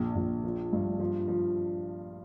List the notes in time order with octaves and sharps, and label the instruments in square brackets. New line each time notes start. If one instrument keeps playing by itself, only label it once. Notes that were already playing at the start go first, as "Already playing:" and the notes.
Already playing: [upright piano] A#1
A#1
F3
G2
F3
F3